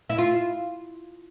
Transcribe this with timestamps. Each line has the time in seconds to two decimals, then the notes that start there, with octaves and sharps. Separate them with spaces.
0.10 E4
0.18 F4